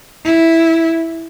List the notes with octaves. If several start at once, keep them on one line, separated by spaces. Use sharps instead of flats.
E4